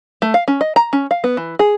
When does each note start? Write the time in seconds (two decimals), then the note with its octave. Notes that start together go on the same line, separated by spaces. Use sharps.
0.22 A3
0.34 F5
0.48 C#4
0.61 D#5
0.76 A#5
0.93 C#4
1.11 F5
1.24 B3
1.37 E3
1.59 G#4